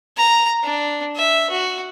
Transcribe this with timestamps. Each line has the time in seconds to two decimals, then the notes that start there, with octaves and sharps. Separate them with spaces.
0.17 A#5
0.63 D4
1.16 E5
1.50 F#4